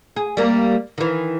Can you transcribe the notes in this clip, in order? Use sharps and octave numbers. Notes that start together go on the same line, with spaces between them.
G#4
G3 A#3
D#3 E3